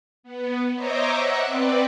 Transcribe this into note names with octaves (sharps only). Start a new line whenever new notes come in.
B3
C5 C#5 D#5 E5 A#5 D6
E5 F#5 F#6
C4 B4 D5